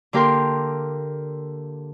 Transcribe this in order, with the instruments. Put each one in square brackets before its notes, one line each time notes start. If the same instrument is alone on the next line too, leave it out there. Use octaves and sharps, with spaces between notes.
[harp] D3 A#3 G4 A#4 G5 C6